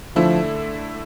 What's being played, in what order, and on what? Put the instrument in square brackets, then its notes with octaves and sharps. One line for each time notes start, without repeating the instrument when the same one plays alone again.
[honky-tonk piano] D3 A3 E4 [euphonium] F3